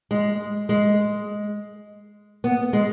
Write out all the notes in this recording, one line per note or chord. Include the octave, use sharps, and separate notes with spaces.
G#3
G#3
B3
G#3